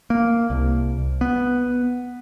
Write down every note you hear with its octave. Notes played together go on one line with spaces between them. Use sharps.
A#3
C2
B3